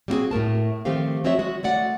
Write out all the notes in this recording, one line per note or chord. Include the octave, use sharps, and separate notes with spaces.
G3 A#3 C4 D#4 F#4 G#4
A2 A3 A#4 A5
D#3 F3 A3 C4 G4 F5
F3 C4 F#4 C#5 D#5 E5
G#3 F#4
G#3 A3 D5 F#5